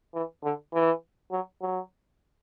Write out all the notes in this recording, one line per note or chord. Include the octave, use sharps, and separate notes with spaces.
E3
D3
E3
F#3
F#3